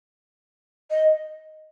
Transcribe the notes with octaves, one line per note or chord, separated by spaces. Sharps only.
D#5